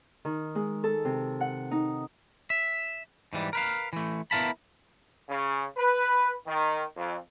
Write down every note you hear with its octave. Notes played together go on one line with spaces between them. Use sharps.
D#3
G#3
A4
C3
F#5
D#4
E5
G#2 E3 G3
A#4 B4 F5
E3 A3
B3 E4 A#4 F5 A5 B5
C#3
B4
D#3
F2